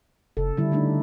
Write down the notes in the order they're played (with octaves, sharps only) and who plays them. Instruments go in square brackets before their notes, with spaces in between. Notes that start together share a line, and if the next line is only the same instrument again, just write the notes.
[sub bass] F#1 [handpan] C#3 A4
[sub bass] D3 [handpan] G3 E4
[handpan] A3 D4 D#4